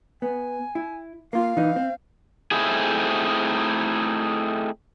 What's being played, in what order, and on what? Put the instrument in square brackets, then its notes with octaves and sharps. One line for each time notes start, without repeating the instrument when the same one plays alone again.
[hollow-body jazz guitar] B3 [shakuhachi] G#5
[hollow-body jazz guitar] E4
[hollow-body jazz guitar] A#3 F4 [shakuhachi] F5
[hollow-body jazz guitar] E3 D#4
C4
[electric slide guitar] A3 C4 D#4 E4 G#4